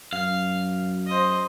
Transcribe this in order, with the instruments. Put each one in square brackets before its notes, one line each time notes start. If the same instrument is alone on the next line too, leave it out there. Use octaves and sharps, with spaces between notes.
[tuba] F#2 [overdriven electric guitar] F5
[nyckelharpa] C5 D#5